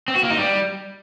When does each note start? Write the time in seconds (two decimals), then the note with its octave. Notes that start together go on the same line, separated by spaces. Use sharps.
0.08 C4
0.15 F#4
0.23 A#3
0.30 D#4
0.38 G3